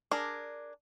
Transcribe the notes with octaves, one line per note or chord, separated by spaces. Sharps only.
D4 G#4 A#4